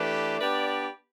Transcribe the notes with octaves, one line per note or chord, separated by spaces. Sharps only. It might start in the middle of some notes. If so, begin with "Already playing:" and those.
Already playing: E3 A3 D4 G4 B4
B3 D4 G4 B4 D5